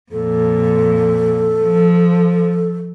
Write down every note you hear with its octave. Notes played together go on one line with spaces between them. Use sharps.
F2 A#2 A4
F3